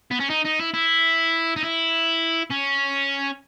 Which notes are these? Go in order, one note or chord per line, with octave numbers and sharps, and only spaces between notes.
B3
C#4
D#4
D#4
E4
E4
D#4
E4
C#4